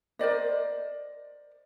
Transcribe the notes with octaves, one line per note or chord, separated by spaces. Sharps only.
A#4 C5 D5 D#5